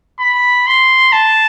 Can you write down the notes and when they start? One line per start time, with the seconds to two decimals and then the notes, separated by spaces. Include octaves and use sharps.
0.20 B5
0.67 C6
1.12 A5